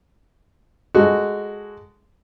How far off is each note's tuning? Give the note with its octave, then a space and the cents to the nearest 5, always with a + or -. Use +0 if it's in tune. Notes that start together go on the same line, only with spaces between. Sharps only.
G#3 -5 F#4 +0 A4 +0